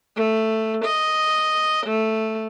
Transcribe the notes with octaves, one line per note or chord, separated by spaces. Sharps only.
A3
D#5
A3